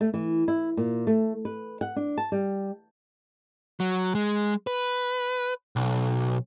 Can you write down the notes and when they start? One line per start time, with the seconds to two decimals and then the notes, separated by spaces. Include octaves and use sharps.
0.01 A3
0.14 E3
0.48 E4
0.77 A#2
1.07 A3
1.45 B4
1.81 F#5
1.96 D4
2.18 A5
2.32 G3
3.80 F#3
4.15 G#3
4.67 B4
5.76 B1